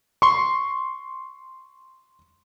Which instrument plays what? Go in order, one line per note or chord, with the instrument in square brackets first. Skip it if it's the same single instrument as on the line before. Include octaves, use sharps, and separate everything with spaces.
[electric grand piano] C6 C#6